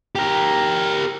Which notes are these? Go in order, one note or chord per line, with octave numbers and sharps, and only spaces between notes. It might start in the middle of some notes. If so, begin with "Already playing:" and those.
G4 A#4